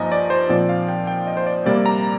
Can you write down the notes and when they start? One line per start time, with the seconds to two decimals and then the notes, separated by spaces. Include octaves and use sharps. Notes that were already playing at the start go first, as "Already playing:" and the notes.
Already playing: G2 F3 A#3 D#4 D#5 G#5 A#5
0.12 D5
0.30 C5
0.49 A#2 F3 C4 D5
0.69 F5
0.89 G5
1.07 G5
1.27 D#5
1.37 C5
1.46 D5
1.66 C3 G3 A#3 D5
1.86 A#5